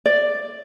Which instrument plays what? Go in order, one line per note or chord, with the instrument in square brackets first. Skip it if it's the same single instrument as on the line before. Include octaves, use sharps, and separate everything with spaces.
[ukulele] D5